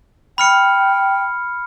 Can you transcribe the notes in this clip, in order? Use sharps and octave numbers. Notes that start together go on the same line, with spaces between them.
G5 B5 F6 C#7